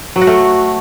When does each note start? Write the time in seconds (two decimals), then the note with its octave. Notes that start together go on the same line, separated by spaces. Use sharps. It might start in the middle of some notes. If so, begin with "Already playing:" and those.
0.16 F#3
0.21 F#4
0.27 A3